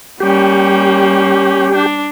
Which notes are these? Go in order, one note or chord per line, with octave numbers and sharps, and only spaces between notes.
G3 A#3 C#4 G4
D4